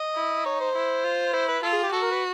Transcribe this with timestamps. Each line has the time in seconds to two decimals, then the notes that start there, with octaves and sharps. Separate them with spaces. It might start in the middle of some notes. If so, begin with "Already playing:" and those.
Already playing: D#5
0.15 E4
0.45 D#4 C#5
0.60 C5
0.75 E4
1.04 F4
1.33 E4 C5
1.48 B4
1.63 F4 A4
1.72 G#4
1.83 G4
1.92 F#4 A4
2.02 A#4
2.11 B4